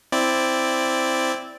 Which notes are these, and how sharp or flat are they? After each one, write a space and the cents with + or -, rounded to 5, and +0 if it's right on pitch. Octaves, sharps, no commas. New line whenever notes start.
C4 +0 E4 +0 D5 +0